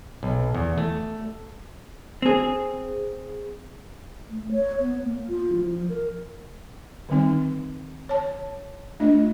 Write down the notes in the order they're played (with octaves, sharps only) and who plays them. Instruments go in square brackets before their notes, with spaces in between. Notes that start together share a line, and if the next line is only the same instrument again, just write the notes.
[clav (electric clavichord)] B1
E2
A3
[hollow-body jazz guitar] C4 G#4
[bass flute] A3
C#5
B3
A#3
F4
F3
A#4
[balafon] D3 D#3 G3 C4 D#4
C#5 A5
A3 D4 F4 D#5